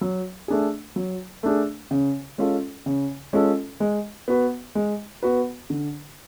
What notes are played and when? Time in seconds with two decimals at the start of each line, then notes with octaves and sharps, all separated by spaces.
0.01 F#3
0.48 A3 D4 G#4
0.96 F#3
1.43 A3 D4 G#4
1.91 C#3
2.38 G#3 C#4 F4 A4
2.86 C#3
3.33 G#3 C#4 F4 A4
3.80 G#3
4.28 B3 F#4 B4
4.75 G#3
5.23 B3 F#4 B4
5.70 D3